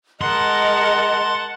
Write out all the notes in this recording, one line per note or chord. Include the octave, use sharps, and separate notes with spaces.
G#3 A#4 D#5 F#5 A5 C6